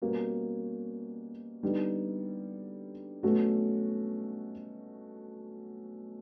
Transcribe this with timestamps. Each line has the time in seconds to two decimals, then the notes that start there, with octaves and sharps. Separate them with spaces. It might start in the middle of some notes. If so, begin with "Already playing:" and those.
0.02 B2 G3 A#3 C#4 F#4
1.63 D3 G3 B3 D#4
3.23 B2 F#3 A3 C#4 F#4